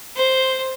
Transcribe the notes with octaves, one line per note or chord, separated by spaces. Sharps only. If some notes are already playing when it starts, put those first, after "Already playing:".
C5